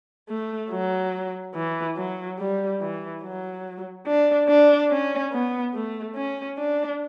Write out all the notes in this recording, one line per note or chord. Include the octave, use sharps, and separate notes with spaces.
A3
F#3
E3
F#3
G3
E3
F#3
D4
D4
C#4
B3
A3
C#4
D4